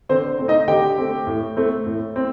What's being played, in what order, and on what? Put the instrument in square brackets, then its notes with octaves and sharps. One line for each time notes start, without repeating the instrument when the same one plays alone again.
[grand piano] D3 C4 C5
A3 C4
D#4 D#5
D3 G4 G5
A3 C4
A2
A3 C4
A2
C4